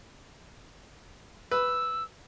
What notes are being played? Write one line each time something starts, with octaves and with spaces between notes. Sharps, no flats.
B4 E6